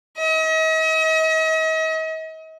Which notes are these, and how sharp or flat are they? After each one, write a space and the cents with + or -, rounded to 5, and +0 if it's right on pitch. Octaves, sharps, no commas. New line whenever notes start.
D#5 +40